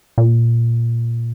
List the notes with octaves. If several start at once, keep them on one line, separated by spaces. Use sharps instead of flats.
A#2